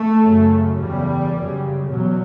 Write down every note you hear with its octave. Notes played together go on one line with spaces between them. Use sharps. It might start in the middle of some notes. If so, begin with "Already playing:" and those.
Already playing: A3
F#2 C#3
E2 C#3 G3
F#2 C#3
E2 B2 F#3